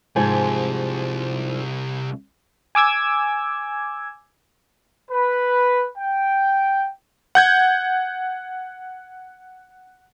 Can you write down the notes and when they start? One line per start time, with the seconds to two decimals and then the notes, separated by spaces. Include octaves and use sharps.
0.16 C2 G#2 F3 G#5
2.75 G#5 D6 E6 G#6
5.10 B4
5.97 G5
7.35 F#5 G6 G#6